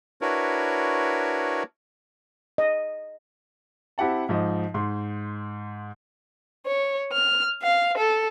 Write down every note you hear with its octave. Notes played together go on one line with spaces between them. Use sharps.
D4 E4 F#4 A#4 B4 C#5
D#5
C4 E4 G4 F#5 A5
G#2 F3 D#5
G#2 C6
C#5
F6
F5
A4